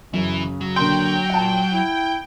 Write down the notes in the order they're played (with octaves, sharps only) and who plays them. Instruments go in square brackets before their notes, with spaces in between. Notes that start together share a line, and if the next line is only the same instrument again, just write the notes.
[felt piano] F#2 [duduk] C#3 [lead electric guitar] E3
[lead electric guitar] F#3
[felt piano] D3 A#3 C6 [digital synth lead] G5
[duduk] A#2 [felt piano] F#5 A5
[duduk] E4